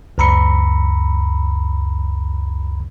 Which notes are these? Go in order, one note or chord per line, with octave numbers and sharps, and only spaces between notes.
C#2 F#2 A#5 B5 E6 C#7